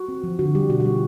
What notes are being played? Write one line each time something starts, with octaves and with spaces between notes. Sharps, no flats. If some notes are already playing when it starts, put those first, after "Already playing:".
Already playing: F#4
C4
F3
D3 F#4
G3 G4
B2 F#4
F#4
G3
F4